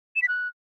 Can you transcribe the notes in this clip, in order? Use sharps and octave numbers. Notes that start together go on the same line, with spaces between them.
E7
B6
F#6